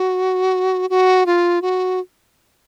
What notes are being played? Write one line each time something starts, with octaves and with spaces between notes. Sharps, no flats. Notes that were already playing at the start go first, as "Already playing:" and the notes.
Already playing: F#4
F#4
F4
F#4